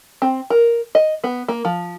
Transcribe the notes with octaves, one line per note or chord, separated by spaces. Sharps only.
C4
A#4
D#5
B3
A#3
F3